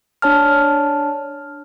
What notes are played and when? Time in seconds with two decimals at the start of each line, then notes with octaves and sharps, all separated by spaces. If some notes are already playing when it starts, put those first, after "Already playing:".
0.22 D4 C#5 A5 F6